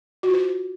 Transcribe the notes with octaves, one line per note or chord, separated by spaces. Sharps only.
F#4
F4
C5